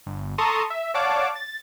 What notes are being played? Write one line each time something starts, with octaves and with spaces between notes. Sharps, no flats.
G1
A4 A5 A#5 C6 C#6 D#6
E5
C#5 D5 F5 F#5 A5 D6
A6